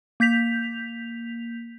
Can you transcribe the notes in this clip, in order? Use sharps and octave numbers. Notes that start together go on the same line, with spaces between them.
A#3 G6 B6 F7